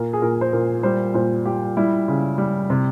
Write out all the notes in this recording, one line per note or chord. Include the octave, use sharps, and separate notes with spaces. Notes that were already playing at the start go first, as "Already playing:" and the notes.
Already playing: A#2 A#4
G#4
A#2 A#4
C5
A#2 A#4
G3 C5
A#2 C5
G3 G4
G3 E4
C#3
G3
C3